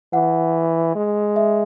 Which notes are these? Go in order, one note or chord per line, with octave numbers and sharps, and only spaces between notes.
E3 F#5
G#3
E5